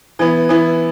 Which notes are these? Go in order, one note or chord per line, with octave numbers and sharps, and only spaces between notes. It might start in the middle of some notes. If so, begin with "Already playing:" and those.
E3 B3 E4
E3 B3 E4